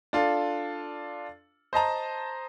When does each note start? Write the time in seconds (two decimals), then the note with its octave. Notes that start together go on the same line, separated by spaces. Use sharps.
0.13 D4 F4 A4
1.73 C5 D#5 A5 A#5